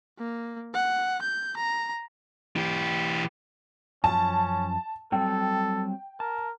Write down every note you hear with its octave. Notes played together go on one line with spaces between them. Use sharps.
A#3
F#5
G6
A#5
E3 G4
F#2 F3 C#4 A5
F#3 G3 C4 A4 G5
A#4 A5